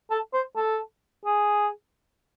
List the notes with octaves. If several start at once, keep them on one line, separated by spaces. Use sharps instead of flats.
A4
C5
A4
G#4